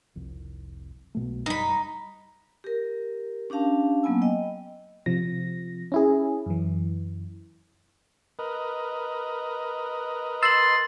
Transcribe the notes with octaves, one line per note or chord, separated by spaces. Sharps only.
F1 C2
B1 B2 A3
F#1 C3 G3 D#4 B5
G4 A#4
C#4 D4 G4 F5 A5
F#3 A#3 B3 G#5 E6
D#5 G5
C3 F3 A#6
C#4 E4 G#4
F#2 E3
A#4 B4 D#5
C6 E6 A6 F#7